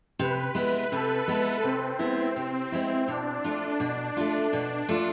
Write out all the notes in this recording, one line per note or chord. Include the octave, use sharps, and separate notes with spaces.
C3 B4
G#3 B3 E4
C3 A4
G#3 B3 E4
C3 C4
G#3 B3 E4
C3
G#3 B3 E4
B2 D4
A3 D4 F4
B2 D4
A3 D4 F4
B2
A3 D4 F4